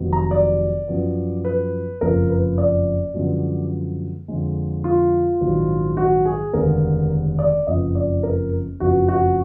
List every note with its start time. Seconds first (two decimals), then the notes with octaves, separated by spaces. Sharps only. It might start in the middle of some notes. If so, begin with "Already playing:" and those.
Already playing: F1 F2 D#3 F#3 B3
0.13 A#5
0.31 D5
0.88 F#2 F3 B3
1.45 B4
2.01 F#1 F2 F3 A#3 A#4
2.30 B4
2.58 D5
3.14 F#2 D3 F3 G#3 B3
4.28 F2 D3 G#3
4.84 F4
5.41 A#1 G#2 D#3 F#3
5.97 F#4
6.25 G#4
6.53 F1 D#2 D3 G#3 B3 A#4
7.39 D5
7.67 F#1 F2 F3 B3 D#5
7.95 D5
8.23 A#4
8.80 F#1 F2 F3 B3 F#4
9.08 F#4